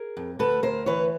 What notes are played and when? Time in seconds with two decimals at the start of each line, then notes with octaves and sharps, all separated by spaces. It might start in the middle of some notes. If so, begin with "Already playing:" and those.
Already playing: G#4 A#4
0.17 F2
0.39 D2 A4 B4
0.63 D2 A#4 C5
0.86 E3 B4 C#5